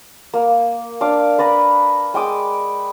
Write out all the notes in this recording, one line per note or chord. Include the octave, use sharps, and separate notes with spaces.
A#3
D4 F5 D6
B4 D5 A#5 B5
G#3 G5 D6 D#6